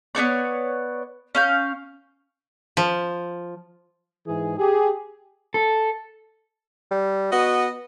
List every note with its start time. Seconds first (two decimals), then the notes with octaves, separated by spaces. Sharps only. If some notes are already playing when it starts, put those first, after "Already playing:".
0.15 B3 D#4 C#5 D5
1.35 C#4 F5 G6
2.77 F3
4.26 G#2 E3 G#4
4.58 G4 G#4
5.54 A4
6.91 G3
7.33 B3 F#4 D#5